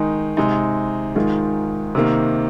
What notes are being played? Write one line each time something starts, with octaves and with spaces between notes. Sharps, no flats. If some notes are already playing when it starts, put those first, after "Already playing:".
Already playing: D#3 G#3 D#4
C3 G#3 D#4
G#2 D#3 G#3 F4 G#4
C3 D#3 A#3